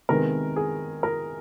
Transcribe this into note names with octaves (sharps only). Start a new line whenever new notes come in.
C3 D#3 G#3 B3 A#4
G#4
A#4